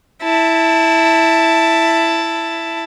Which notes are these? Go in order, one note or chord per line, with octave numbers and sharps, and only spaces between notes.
E4 A5